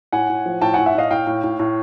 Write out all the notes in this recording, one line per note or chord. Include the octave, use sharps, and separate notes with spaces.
A2 F#5 G#5
A2
F3
A2 G5 A5
A2 F#5 G#5
E5 F#5
A2 D#5 F5
A2 F5 G5
A2
A2
A2